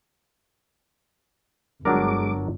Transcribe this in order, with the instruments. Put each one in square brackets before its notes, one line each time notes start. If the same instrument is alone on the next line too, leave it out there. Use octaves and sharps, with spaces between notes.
[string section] G1 [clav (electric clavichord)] F#3 D4 A#4 [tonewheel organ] G#3 D6